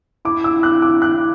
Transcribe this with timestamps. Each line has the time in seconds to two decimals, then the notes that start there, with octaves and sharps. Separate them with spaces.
0.25 E4 D6
0.44 E6
0.63 F#6
0.82 D6
1.02 F#6